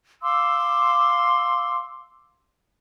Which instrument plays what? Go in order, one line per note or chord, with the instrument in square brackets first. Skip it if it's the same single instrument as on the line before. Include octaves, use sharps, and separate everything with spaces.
[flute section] F5 C6 D6 E6